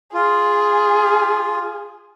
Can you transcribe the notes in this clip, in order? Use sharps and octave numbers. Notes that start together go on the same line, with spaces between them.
F4 G#4